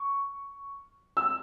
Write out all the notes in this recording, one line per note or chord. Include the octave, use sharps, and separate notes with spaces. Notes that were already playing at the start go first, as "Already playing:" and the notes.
Already playing: C#6
E6